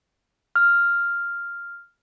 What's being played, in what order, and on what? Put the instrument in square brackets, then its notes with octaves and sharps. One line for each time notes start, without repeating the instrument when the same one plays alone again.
[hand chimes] F6